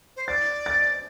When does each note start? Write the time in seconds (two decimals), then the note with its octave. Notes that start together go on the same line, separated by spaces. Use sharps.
0.16 C5
0.28 D5 A6
0.66 A6